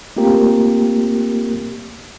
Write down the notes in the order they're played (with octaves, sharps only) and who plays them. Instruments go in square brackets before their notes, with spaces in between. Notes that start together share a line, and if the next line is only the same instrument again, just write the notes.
[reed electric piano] A3 A#3 C4 F4 G4 A#4